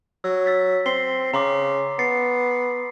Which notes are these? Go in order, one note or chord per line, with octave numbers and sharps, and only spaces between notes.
F#3 E6
E6 A6 B6
C4 C6 C7 G7
C#3 A#5 C6 D6
B3 A6 C7 C#7